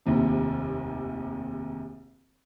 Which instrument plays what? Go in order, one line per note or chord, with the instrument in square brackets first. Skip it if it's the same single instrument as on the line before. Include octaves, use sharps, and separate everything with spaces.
[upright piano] F1 A#1 D#2 C3